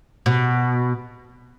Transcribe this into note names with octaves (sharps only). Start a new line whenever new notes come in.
B2